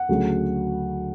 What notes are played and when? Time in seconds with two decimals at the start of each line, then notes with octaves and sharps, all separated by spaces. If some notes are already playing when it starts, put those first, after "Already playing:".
Already playing: F#5
0.09 D2 C#3 F#3 A3